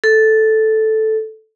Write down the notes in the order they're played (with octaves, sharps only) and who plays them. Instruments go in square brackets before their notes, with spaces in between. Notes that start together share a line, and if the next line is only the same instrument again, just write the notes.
[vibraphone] A4